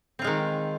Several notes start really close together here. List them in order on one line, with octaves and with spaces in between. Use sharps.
C4 F4 G#3 D#3